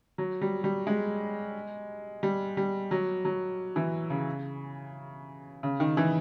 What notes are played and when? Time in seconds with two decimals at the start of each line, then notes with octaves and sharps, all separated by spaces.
0.18 F#3
0.41 G3
0.64 G3
0.87 G#3
2.23 G3
2.57 G3
2.91 F#3
3.25 F#3
3.76 E3
4.10 C#3
5.63 C#3
5.80 D#3
5.97 E3